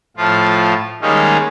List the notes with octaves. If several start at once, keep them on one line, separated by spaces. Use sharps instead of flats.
A2 F3 F4
D#3 G3 G#3 A#3 C#4 D#4